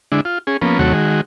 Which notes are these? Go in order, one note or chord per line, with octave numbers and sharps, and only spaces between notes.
D3 G#3 D4 E4
F4
C#4 G#4
F3 A#3 B3 C#4
D#2 C3 F#3 A3 F#4 C#5
D#3 G#3 F#4